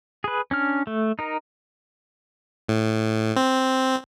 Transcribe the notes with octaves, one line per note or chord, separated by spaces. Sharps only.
G#4 B4
C#4 D4 F6
A3
D#4 A#4
A2
C4